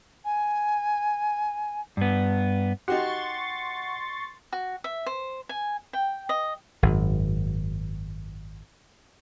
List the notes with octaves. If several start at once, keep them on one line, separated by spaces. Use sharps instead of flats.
G#5
G2 B3
D#4 F#4 G4 F#5 C6 C#6 A6
F#4
E5
C5
G#5
G5
D#5
G#1 F#2